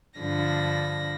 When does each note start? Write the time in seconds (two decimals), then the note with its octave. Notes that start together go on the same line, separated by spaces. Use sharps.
0.20 G2 D3 F3 B5 A#6